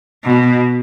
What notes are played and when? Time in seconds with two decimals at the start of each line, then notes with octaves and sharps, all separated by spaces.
0.24 B2